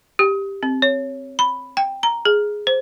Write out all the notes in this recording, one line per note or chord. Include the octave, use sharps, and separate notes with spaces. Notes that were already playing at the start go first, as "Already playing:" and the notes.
G4
C4
C#5
B5
G5
A#5
G#4
C5